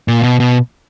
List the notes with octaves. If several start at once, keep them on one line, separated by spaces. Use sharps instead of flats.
A#2
B2
B2